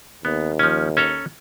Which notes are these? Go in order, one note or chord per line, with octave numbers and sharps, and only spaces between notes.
D#2 B3
F3 C#4
C#4 A4 A#5